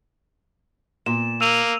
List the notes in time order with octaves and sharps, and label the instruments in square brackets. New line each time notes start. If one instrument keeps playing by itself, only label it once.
[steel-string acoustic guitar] A#2 [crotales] E7
[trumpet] A#3 [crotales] E6 D#7 F7